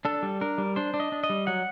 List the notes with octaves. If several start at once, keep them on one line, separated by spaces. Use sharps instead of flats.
D4 A4
G3
D4 A#4
G3
D4 C5
D4
D#5
D4
D#5
G3
F#3 F#5